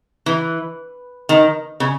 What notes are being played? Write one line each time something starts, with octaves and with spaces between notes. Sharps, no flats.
E3
D#3
C#3